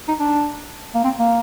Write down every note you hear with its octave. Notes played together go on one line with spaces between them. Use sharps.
D#4
D4
A#3
C4
A#3